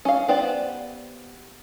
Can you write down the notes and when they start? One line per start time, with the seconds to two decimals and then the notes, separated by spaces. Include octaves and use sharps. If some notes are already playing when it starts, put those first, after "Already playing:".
0.05 C#4 F5
0.28 B3 G4 C5 D5